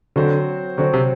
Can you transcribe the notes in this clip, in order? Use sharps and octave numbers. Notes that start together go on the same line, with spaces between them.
D3 F#3 C4 F#4 C5
D3 F#3 C4 F#4 C5
C3